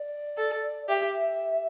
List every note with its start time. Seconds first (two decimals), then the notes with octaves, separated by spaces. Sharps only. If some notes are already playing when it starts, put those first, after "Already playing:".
Already playing: D5
0.37 A4
0.88 G4 E5